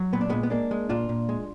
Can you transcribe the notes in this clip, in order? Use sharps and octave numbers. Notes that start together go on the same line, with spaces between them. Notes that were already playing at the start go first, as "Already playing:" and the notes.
Already playing: F#3
A#2 B3
D4
A#2 G#3 B3
B3
G#3 A#3 D4
G#3
A#2 D4 F4
A#2
G#3